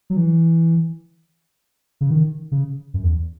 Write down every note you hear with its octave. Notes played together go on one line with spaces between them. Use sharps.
F#3
E3
C#3
D#3
C#3
F#2
E2